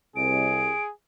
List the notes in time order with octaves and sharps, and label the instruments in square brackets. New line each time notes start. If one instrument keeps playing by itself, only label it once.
[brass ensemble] C2 [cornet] G#4 [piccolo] D7